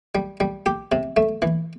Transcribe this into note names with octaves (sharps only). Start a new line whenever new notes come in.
G3
G3
G4
C3
A3
E3